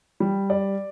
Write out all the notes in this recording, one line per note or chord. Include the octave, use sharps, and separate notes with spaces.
G3
D5